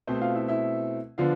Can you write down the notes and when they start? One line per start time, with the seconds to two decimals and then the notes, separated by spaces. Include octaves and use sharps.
0.07 B2 A3 C4 C5
0.21 F4 F5
0.35 E4 E5
0.48 E4 E5
1.18 D3 F3 B3 D4 F4 F5